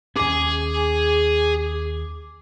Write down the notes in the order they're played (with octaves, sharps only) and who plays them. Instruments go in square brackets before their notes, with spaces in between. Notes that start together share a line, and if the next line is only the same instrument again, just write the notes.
[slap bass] D#2 C#4 [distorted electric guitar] G#4 G#5 [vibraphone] D6